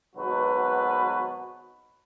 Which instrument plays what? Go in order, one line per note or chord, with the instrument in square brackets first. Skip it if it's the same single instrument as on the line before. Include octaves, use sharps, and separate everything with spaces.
[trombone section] G#1 B2 F#3 B3 F#4 B4